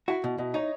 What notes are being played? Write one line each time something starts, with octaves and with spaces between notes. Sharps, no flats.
E4 F#4
B2
B2 D#5
D#4 C#5